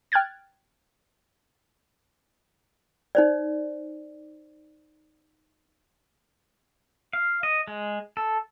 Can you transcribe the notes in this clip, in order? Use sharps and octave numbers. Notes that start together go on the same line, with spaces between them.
G5 F6 F#6 G#6 A6
D#4 C5 D5
F5
D#5
G#3
A4